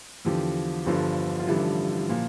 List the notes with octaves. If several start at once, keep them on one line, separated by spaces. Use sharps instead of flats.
E2 D3 F3 G4
G1 G2 D3 F3
F4
A1 G2 D3 F3 E4
A#2 F3